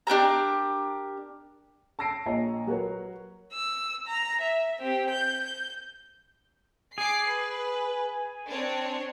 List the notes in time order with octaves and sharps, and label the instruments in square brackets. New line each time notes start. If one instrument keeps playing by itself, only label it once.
[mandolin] D4 G4 A#4 A#5
[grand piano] A5 E6 A#6 C7 D7
A#1 A#2 C#5 D#5 A#5
F#3 F#4 A#4 B4 C#5
[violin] E6
A#5
E5
C4 G4
G6
G6
[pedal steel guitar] G#4 [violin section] D6 C7
[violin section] B4
C4 D4 C#5